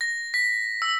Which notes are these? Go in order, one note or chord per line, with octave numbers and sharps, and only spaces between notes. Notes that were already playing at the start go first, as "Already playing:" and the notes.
A#6
B6
E6